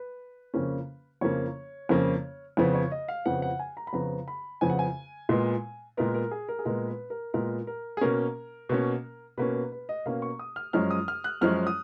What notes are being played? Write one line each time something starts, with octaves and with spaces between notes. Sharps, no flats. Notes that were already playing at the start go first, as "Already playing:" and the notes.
Already playing: B4
F2 C#3 F3 A#3 C#4
F2 C#3 F3 A#3 C#4 C#5
F2 C#3 F3 A#3 C#4
F2 C#3 F3 B3
C#5
D#5
F5
F2 C#3 F3 B3 F#5
F#5
G#5
A#5
B5
F2 C#3 F3 B3 A#5
B5
F2 C#3 F3 B3 G#5
F#5
G#5
A#2 G#3 B3
A#2 G#3 B3 A#4
A#4
G#4
A#4
G#4
A#2 G#3 B3 A#4
B4
A#4
A#2 G#3 B3 A#4
A#4
G#4
B2 A#3 C#4 A#4
B2 A#3 C#4
B2 A#3 C#4 B4
B4
B4
D#5
B2 A#3 C#4 F5
C#6
D#6
F6
F#2 F3 G#3 C#4 F6
D#6
F6
F#6
F#2 F3 G#3 C#4 F6
D#6